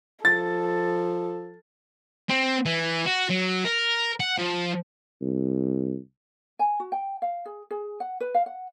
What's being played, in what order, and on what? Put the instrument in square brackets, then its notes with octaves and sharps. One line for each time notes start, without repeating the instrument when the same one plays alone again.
[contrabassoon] F3 [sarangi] A4 [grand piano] A6
[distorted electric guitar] C4
E3
F#4
F#3
A#4
F#5
F3
[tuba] C2
[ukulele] G#5
F#4
G5
F5
G#4
G#4
F#5
B4
F5
F#5